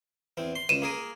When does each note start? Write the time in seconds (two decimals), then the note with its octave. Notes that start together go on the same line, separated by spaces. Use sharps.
0.37 E2 C4
0.56 C6
0.69 C#2 D#7 E7
0.82 A#3 G#4 A#4